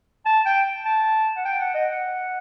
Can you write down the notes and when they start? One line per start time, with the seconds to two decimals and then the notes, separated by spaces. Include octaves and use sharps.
0.26 A5
0.46 G5
0.85 A5
1.36 F#5
1.45 G5
1.60 F#5
1.74 D#5
1.90 F#5